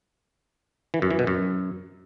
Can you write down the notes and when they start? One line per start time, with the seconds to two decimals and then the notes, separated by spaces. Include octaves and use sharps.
0.94 E3
1.02 F#2
1.11 E3
1.19 B2
1.27 F#2